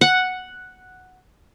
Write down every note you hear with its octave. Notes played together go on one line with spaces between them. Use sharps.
F#5